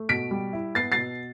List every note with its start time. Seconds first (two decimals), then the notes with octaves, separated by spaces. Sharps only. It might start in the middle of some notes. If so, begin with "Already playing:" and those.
Already playing: A3
0.09 B2 B6 D7
0.31 G3
0.53 E4
0.75 B3 A6 C7
0.92 A6 C7
0.98 B2